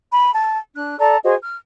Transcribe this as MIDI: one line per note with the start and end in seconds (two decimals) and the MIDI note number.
0.11 0.31 83
0.32 0.58 81
0.75 0.98 62
0.75 0.98 90
0.99 1.17 69
0.99 1.17 74
0.99 1.17 81
0.99 1.17 82
1.23 1.34 66
1.23 1.34 68
1.23 1.34 72
1.23 1.34 75
1.41 1.55 89